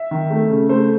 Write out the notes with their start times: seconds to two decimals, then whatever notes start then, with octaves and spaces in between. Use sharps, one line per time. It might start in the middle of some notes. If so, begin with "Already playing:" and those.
Already playing: E5
0.11 D#3
0.31 A3
0.50 C#3
0.69 A3 C5